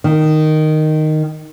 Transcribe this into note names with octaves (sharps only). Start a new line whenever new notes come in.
D#3